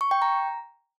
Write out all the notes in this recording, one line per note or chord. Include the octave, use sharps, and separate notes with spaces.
C#6
G5
A#5